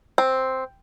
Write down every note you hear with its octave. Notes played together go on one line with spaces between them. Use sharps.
C4